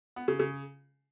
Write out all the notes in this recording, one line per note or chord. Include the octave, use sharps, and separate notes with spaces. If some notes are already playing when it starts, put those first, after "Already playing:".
B3
C#3
C#3